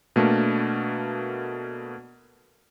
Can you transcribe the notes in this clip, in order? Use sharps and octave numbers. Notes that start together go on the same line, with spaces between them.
B2 A3 A#3 D4 A#4